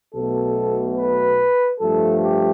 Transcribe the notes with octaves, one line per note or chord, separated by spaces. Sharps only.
B1 B2 A3 A4
B4
G2 F3 A3 A4
G4